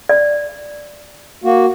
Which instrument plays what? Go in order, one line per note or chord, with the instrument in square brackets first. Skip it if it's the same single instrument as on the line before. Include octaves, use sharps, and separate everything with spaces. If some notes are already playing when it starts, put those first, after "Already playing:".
[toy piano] D5
[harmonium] A#3 F#4